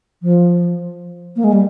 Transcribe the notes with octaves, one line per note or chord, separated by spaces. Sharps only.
F3
A#3
G#3
G3